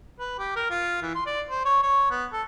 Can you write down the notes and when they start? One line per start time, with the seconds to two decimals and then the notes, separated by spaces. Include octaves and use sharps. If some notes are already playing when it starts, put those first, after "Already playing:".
0.20 B4
0.39 G4
0.56 A#4
0.70 F4
1.02 E3
1.15 C6
1.27 D5
1.50 C5
1.65 C#5
1.83 C#5
2.11 B3
2.33 A4